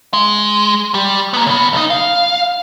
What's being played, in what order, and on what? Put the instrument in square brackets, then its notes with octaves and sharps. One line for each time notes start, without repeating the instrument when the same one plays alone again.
[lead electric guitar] G#3
G3 G4
A#3 B3
C#3 B3
B1 D#4
F5